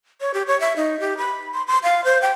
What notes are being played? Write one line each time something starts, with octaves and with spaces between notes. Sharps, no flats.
C#5
G4
C#5
E5
D#4
G4
B5
C6
C6
F5
C5
G5